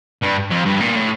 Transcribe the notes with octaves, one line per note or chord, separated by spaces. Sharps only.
G2
F2
G2
A#2
A2